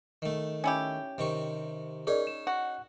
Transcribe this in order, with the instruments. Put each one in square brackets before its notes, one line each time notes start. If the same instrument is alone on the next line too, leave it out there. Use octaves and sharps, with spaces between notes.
[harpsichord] D#3 A3
[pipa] C#4 E4 G4
[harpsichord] C3 D#3 C#6
[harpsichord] C#4 D#4 [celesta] G#4 A#4 D5
[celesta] E7
[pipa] F#4